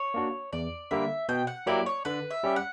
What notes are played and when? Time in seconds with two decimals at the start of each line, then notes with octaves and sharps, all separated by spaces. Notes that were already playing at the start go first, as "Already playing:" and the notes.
Already playing: C#5
0.14 A#3 D4 F#4
0.53 E2 D5
0.91 D3 G3 A#3 E5
1.29 B2 G5
1.47 F#5
1.66 F#3 A#3 E4 G4 D5
1.86 C#5
2.05 D3 B4
2.31 E5
2.44 G3 C#4 G4
2.56 F#5